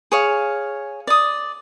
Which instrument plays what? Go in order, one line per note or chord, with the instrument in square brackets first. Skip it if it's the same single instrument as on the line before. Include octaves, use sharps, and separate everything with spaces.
[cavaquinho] G#4 C#5 F5
D5 D#6